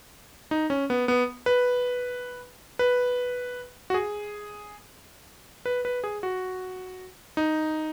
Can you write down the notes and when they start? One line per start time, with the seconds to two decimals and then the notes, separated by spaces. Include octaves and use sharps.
0.51 D#4
0.70 C#4
0.90 B3
1.08 B3
1.46 B4
2.79 B4
3.90 F#4
3.94 G#4
5.66 B4
5.85 B4
6.04 G#4
6.23 F#4
7.37 D#4